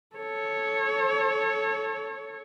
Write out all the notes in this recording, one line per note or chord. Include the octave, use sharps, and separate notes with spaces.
A4 C#5